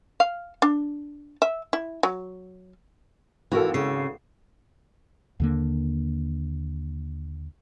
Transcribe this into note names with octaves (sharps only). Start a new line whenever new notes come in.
F5
D4
E5
E4
F#3
G#1 E3 E4 F#4 A4 A#4
C#3 C7
D#2 D3 A#3